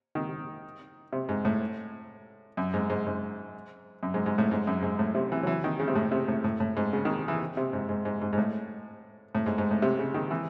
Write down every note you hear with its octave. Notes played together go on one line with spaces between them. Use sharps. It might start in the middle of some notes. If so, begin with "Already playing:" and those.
D#3
C3
G#2
A2
F#2
G#2
G#2
G#2
F#2
G#2
G#2
A2
G#2
F#2
G#2
A2
C3
E3
F#3
E3
D#3
C#3
C3
A2
C3
A2
A2
A2
G#2
C#3
D#3
E3
C3
G#2
G#2
G#2
G#2
G#2
A2
A2
G#2
G#2
A2
C3
C#3
D#3
E3